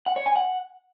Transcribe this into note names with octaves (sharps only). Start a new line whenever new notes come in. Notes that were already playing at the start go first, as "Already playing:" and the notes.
F#5
C#5
G#5
F#5